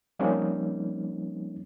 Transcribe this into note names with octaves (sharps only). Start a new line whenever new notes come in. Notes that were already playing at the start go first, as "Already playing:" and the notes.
F3 G3 A#3 C4 C#4 D#4